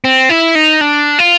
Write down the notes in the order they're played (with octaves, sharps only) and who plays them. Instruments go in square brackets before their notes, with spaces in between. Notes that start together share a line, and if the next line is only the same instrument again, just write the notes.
[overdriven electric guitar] C4
E4
D#4
D4
F4